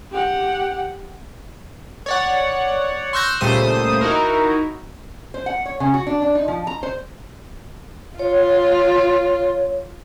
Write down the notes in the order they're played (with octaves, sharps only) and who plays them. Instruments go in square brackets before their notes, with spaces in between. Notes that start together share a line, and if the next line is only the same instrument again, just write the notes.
[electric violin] G4 F#5
[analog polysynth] C#5 D5 F#5
C6 C#6 E6 F#6 G6 A#6
C#2 A#2 G3 A3 C5 D#6
D#4 E4 F#4 A#4
[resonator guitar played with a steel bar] C5
F#5
C#5
C#3
F#4
D4
D4
D#4
F3
A#5
C5
[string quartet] F4 [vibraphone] C#5